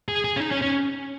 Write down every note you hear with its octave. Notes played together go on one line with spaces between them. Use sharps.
G#4
G#4
C#4
D#4
C#4
C#4